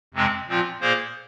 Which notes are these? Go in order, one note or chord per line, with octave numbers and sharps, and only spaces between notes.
F2 C3 G#3 C4
A#2 F3 C4 F4
A#2 A#3 G#4 C5